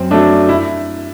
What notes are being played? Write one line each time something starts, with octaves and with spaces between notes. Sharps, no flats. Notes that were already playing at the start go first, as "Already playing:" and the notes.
Already playing: F#2 C4
F#3 A3 D4
E4